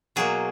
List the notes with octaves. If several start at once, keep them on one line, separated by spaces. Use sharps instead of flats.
B2 F#3 A#3 G#4